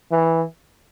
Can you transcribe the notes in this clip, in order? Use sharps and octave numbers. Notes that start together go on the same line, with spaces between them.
E3